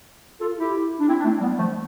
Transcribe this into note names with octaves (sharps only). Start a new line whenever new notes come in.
F4 A4
E4 G4
D4
C4 E4
D4
A3 C4
G3 B3
F3 A3